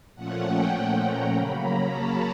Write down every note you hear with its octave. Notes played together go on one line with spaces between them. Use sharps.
A#2 F3 A3 C#4 F#5
G5
A#5
C#3 F#3 A#3 C#4 B5
A#5
A5